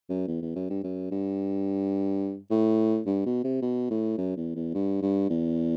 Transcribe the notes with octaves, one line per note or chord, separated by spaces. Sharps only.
F#2
E2
E2
F#2
G2
F#2
G2
A2
G2
B2
C3
B2
A2
F#2
E2
E2
G2
G2
E2